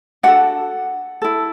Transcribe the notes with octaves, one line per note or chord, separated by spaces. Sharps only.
D4 F#4 A4 F#5
E4 A4